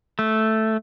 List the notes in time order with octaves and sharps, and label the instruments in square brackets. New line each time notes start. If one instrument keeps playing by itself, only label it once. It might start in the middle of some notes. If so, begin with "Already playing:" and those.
[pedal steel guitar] A3